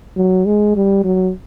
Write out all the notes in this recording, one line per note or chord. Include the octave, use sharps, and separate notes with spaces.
F#3
G#3
G3
F#3